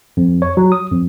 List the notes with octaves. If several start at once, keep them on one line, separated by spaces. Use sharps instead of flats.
F2
C#5
F#3
D#6
F2